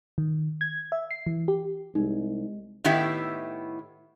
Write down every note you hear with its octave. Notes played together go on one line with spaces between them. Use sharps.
D#3
G#6
E5
C7
E3
G4
C2 G#3 D#4
A2 D#3 B3 E4 G4